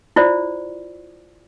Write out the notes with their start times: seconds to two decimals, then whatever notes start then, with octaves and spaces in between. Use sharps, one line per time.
0.16 E4 F4 C5 D5